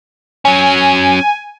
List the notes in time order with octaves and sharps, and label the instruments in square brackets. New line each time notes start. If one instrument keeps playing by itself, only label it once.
[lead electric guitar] F#3 C#4 [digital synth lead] G#5